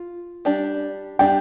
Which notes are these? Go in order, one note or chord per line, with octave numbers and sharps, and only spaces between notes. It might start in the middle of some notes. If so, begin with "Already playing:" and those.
Already playing: F4
G3 D4 G4
G3 D4 G4 G5